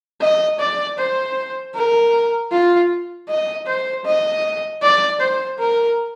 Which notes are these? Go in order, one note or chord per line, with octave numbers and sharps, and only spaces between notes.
D#5
D5
C5
A#4
F4
D#5
C5
D#5
D5
C5
A#4